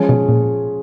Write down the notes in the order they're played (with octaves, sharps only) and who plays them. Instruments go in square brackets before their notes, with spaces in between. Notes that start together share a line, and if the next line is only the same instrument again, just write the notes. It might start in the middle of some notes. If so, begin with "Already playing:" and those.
Already playing: [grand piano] F3 G#3 C#4 G#4
[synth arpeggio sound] B2
A#2